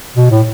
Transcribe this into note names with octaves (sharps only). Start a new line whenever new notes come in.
B2
A2